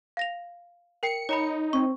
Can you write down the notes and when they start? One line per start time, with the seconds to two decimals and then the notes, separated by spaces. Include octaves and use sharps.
0.17 F5 A#6 F7
1.03 A#4 G5 C7 C#7
1.29 D#4 C#5 A#5 B5
1.73 C4 C#6